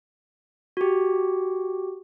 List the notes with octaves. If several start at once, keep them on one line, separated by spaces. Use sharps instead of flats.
F#4 G4